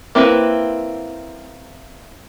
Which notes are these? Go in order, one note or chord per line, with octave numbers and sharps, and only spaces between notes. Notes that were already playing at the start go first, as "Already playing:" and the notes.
A#3 C4 E4 B4